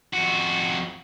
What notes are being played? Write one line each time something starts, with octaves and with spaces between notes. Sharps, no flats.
F2 F#4